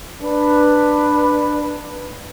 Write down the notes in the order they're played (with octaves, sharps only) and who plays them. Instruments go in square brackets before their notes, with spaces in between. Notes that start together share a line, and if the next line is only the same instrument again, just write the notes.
[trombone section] D4 B4